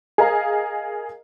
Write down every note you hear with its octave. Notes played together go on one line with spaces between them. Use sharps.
G#4 A#4 D#5 F5 A#5